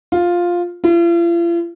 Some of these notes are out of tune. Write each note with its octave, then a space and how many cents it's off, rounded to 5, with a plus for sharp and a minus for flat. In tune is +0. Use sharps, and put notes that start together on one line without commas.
F4 +5
F4 -45